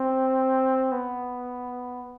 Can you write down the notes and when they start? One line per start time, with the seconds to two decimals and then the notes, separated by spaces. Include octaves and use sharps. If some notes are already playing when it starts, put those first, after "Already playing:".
Already playing: C4
0.92 B3